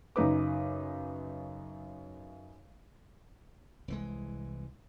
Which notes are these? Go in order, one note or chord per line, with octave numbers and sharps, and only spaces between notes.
F#2 C#3 D#4 B4 D6
C2 E3 G#3